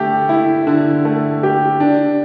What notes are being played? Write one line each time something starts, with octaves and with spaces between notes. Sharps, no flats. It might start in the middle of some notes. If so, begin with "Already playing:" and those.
Already playing: D3 A3 G4
E4
D3
A3
G4
D4